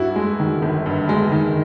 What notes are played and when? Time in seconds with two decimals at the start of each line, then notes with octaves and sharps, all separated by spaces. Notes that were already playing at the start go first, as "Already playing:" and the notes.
Already playing: G2 E4 F#4
0.16 G#3
0.40 D#3
0.62 G1
0.86 G2
1.09 G#3
1.32 D#3